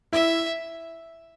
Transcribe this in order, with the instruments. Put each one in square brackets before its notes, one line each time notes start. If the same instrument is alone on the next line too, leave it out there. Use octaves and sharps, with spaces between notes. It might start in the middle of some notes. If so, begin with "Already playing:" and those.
[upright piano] E4 [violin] E5